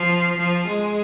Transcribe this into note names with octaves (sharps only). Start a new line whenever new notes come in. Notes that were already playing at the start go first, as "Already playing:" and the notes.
Already playing: F3
F3
G#3